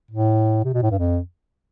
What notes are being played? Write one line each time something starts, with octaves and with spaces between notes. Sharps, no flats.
A2
C3
B2
A2
G2
F2